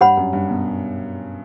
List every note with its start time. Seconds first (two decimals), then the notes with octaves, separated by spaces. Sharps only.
0.01 G2 G4 C#5 F#5 B5
0.17 F#2
0.33 G2
0.50 B2